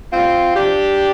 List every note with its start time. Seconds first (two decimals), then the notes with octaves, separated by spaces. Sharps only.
0.13 A2 G3 C4 F4
0.56 C3 F3 D4 G4